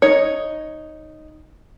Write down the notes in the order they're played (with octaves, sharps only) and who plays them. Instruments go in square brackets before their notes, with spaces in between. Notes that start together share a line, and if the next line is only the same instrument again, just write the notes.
[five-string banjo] D#4 C#5